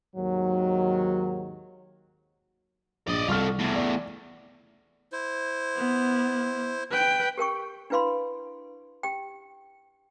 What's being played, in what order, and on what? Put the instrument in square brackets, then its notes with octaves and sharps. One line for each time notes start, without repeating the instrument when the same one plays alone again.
[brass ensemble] D#2 G#2 D#3 F#3
[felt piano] A#1 [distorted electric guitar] D5 D#5
[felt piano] C2 C#6 F6 [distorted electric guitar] F4 A4
[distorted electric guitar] E2 A2
[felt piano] D5
[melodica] E4 C5
[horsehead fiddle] B3
B4 G5
[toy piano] G4 A#4 G5 C#6
D4 E4 B4 F5 B5 C6
G4 G5